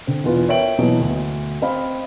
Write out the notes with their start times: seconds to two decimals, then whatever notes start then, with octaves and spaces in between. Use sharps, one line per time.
0.07 D3 C4
0.24 E2 B2 B3 F4
0.49 A#4 C#5 E5 G5 D7 F#7
0.78 B2 E3 F#3 A#3
1.01 D2
1.62 C4 C5 D#5 F5 B5